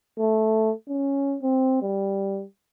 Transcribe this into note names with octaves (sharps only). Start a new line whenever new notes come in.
A3
C#4
C4
G3